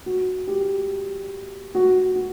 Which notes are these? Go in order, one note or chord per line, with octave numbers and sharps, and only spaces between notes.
F#4
G4
F#4
F#4